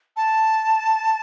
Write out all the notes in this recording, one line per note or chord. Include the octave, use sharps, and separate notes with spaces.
A5